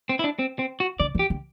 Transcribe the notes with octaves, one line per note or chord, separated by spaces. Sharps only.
C4
E4
D4
C4
C4
F#4
D3 D5
E3
G4
D3